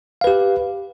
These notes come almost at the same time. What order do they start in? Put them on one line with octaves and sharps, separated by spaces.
F5 B4 G4